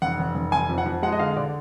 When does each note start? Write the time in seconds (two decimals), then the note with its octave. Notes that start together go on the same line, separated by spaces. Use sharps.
0.02 F1 F#5
0.19 F1
0.35 F1
0.52 F1 G#5
0.69 F2
0.78 F#5
0.86 F2
1.03 G#3 F#5
1.12 D#5
1.19 D3 F5
1.36 D3 D5